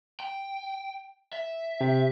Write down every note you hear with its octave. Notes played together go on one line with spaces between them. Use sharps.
G5
E5
C3